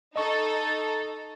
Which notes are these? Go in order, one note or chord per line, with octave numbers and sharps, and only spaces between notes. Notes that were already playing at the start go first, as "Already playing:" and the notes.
D#4 A4 D#5 C#6